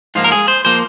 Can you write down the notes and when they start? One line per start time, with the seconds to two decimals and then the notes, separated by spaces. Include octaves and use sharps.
0.15 G#2 F3 A#3 F4
0.24 A#4
0.32 G#4
0.48 C5
0.65 F3 A#3 C5